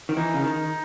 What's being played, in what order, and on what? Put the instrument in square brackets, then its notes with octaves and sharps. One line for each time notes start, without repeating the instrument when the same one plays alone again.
[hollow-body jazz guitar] D#3
[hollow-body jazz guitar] E3 [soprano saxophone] D#4
[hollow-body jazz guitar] C#3
[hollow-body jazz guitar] D#3 [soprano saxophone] D#4